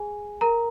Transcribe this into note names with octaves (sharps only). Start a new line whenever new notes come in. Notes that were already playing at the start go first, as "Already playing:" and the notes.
Already playing: G#4 G#5
A#4 A#5